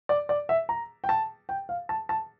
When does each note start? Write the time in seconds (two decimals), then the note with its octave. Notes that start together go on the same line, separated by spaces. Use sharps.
0.09 D5
0.29 D5
0.49 E5
0.69 A#5
1.04 G5
1.09 A5
1.49 G5
1.69 F5
1.89 A5
2.09 A5